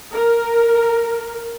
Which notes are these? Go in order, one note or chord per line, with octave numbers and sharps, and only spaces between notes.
A#4